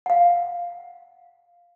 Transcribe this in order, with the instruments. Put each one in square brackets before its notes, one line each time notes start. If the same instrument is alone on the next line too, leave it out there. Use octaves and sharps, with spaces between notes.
[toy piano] F5 F#5